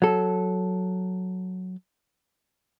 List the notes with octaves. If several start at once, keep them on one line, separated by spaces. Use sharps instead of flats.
F#3 A4